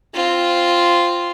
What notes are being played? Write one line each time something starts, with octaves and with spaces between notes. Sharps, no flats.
C4 F4